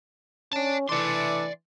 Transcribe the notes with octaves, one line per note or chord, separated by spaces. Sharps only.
C#4 D5 A5
E3 A3 D4 D5 C6 D6